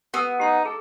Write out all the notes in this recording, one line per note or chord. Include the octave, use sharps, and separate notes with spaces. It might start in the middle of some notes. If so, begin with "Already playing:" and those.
B3 G4 D#6 E6
D#4 G4 C6
G#4 A4